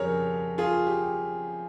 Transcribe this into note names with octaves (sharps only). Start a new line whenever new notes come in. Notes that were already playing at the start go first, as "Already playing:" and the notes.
Already playing: F2 C#3 G3 G#4 A#4 C#5
F4 G#4
G4